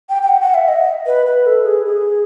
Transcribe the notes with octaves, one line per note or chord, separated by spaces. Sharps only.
G5
G5
F#5
F#5
E5
D#5
B4
B4
A4
G#4
G#4